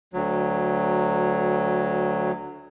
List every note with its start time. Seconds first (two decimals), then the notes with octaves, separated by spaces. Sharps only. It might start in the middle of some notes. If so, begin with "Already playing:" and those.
0.13 D2 F#3